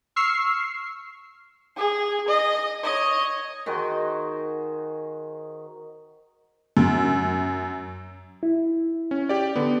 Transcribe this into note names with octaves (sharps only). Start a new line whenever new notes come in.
C#6 E6 F6 C7
G#4
D#5
C#5 D#5
D#3 F#4 G#4 C5
F#2
E4
C#4
G4 D5
D3 B3